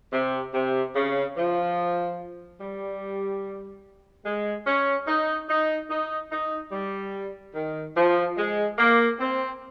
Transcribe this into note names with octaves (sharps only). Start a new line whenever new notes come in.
C3
C3
C#3
F3
G3
G#3
C#4
D#4
D#4
D#4
D#4
G3
D#3
F3
G#3
A#3
C4